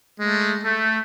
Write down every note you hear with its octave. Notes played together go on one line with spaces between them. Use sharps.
G#3 A3
A3